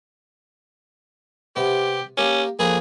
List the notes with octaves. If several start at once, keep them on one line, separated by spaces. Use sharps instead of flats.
C3 B3 G4
A#3 C#4 G4
F2 A#3 G#4 B4